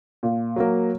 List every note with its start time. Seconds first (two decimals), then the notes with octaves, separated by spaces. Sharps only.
0.23 A#2
0.56 F#3 A#3